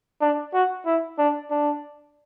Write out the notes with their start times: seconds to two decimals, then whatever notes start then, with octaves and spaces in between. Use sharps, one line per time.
0.21 D4
0.53 F#4
0.86 E4
1.18 D4
1.50 D4